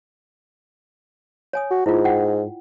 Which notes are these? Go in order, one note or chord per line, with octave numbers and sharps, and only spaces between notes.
C#5 G#5 D#6
F#4
G#2 E4 F4
F#5 G5